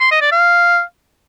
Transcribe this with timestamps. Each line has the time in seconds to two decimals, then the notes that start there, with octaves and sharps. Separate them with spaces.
0.01 C6
0.11 D#5
0.22 D5
0.32 F5